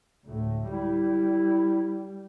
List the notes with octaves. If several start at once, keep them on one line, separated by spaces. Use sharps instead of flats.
D2 A2
G3 E4